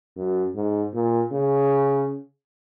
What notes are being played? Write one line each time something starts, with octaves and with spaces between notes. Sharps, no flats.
F#2
G#2
A#2
C#3